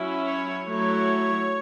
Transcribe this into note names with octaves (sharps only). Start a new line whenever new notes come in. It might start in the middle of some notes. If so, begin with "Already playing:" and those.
Already playing: F#3 C#4 E4
C#5
F#3 A3 E4 C#5